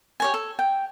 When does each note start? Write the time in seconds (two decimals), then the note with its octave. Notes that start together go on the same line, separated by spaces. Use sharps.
0.20 G4 C#5 G#5
0.34 A4
0.59 G5